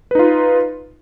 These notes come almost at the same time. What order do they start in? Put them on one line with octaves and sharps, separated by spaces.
B4 D#4 F4